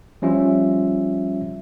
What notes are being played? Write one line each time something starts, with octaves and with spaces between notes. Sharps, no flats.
F3 G3 C#4 F4 E5